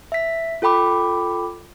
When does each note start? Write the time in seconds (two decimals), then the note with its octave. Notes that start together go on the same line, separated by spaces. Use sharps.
0.12 E5 B6
0.62 F4 A4 G5 B5 D6